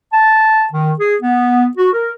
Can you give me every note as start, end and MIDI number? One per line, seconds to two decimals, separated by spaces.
0.12 0.65 81
0.73 0.92 51
1.00 1.15 68
1.22 1.66 59
1.77 1.90 66
1.93 2.13 70